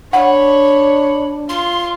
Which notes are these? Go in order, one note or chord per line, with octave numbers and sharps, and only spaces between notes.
D4 C#5 F#5 B5
F4 C6